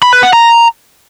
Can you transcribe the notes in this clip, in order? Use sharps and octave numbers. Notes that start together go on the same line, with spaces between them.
B5
B4
F#5
A#5